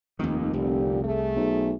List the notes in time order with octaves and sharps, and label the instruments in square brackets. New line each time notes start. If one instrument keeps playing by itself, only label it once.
[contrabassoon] F1 [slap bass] D#2 D#3
[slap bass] C2 [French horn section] A#2 D3 G4
[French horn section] A3 G#4
[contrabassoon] B1